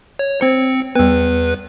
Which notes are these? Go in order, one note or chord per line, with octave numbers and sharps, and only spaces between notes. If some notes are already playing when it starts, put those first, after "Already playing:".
C#5
C4 C5 C#7
E2 G3 B3 B4